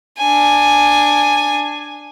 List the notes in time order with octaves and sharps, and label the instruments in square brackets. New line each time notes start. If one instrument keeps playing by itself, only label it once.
[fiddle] D4 G#5